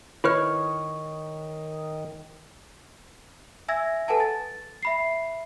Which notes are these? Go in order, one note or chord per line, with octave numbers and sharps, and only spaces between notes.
D#3 E4 B4 C#5 F6
E5 G#5 E6 G#6 A#6
A4 B4 F#5 G#5 A5
A6
E5 B5 C7